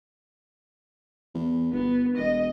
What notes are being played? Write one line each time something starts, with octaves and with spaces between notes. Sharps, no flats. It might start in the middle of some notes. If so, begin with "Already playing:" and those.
E2
G1 B3
E1 D#5